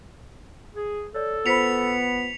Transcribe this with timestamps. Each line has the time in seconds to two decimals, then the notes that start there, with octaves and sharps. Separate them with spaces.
0.75 G#4
1.14 A4 C#5 D5
1.46 B3 F4 C5 B5 B6 C#7 F7